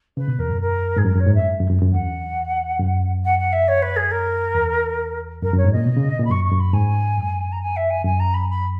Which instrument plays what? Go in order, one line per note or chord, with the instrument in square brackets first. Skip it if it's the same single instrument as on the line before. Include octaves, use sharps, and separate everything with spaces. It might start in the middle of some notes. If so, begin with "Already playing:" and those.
[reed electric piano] C#3 [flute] B4
[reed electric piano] B2
[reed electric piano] E2 [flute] A#4
[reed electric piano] F#2
[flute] A#4
[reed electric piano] G#2 [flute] G#4
[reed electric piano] F#2 [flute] A#4
[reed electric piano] F#2 [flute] C#5
[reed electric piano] G#2
[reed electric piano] F#2 [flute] E5
[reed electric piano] F#2
F#2
F#2
[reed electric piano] E2 [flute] F#5
[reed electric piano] F#2
[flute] F#5
F#5
E5
C#5
B4
G#4
A#4
[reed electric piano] E2
[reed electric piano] F#2 [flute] A#4
[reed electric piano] F#2 [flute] C#5
[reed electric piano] G#2
[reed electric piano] A#2 [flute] D#5
[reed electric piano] B2
C#3
A#2
[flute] B5
[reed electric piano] F#2 [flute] C#6
[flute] C#6
[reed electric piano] F#2
[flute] B5
[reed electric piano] G#2 [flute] G#5
[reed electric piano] F#2
[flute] A#5
G#5
E5
G#5
[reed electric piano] F#2 [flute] G#5
[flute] A#5
B5
B5